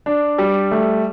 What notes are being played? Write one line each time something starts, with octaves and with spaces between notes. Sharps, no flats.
D4
G3
A3